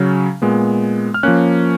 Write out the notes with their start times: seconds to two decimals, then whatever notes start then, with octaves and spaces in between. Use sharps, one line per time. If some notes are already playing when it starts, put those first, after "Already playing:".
Already playing: C#3 F#3 C#4
0.42 A#2 G#3 B3
1.14 F6
1.23 F3 A#3 C#4 F#6